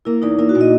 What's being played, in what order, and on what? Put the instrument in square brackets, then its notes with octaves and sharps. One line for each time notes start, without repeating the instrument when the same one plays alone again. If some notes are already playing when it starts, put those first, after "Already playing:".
[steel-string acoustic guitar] A#3 [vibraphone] E4
[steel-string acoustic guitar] E2 [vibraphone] D#4
[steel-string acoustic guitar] A#3 [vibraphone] E4
[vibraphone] F#4
[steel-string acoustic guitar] A#2
[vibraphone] D#5